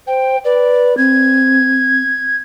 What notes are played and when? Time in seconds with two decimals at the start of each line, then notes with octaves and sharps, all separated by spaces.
0.07 C5 G5
0.45 B4 D5
0.98 C4 G#6